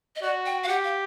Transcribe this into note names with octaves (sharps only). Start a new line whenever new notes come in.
D#5
F#4 D5
G5
F5
G4 F#5
F5